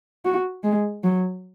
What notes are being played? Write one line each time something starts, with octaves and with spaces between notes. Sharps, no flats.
F#4
G#3
F#3